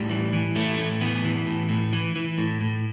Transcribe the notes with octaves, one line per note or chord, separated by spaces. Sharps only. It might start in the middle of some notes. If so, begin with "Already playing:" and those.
Already playing: A2 G3
E3
E3
A2 A3
A2
E3 B3
E3
A2
A2
E3
E3
A2
A2